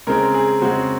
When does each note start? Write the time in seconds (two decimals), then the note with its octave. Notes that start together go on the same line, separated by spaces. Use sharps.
0.07 C#3 G#3 C4 A#4
0.34 G#4
0.62 C#3 G#3 C4 F#4